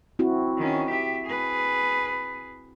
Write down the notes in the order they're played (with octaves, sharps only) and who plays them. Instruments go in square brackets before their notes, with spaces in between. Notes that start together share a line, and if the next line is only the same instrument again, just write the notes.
[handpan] C4 E4 F#4
[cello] D#3 C#4
G4 E5
G#4 B4